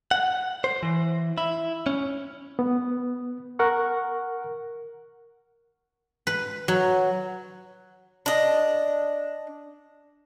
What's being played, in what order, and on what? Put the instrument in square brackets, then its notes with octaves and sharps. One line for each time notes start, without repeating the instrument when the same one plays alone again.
[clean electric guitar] F#5
C5
E3
E4
C#4
[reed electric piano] B3
A#4 F#5 C#6
[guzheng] B4
F#3
[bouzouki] D4 D#5